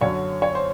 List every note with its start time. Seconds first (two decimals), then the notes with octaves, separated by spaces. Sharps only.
0.01 F#2 D3 F#3 C#5
0.42 C#5
0.55 C5